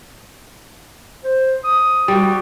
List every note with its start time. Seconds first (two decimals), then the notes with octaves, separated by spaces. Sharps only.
1.24 C5
1.64 D#6
2.08 G3 F#4